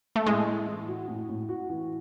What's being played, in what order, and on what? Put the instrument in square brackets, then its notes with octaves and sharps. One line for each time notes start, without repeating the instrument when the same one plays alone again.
[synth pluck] A3
[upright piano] A2 [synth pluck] G#3
[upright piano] A2
E3
F#4
A2
A2
F#4
E3